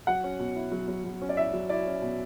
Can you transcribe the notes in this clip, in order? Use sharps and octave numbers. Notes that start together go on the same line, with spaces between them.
F#3 F#5
C#4
B2
E4
F#3
F#3
F#3
C#4
D5
E4 E5
F#3
E4 D5
C#4
B2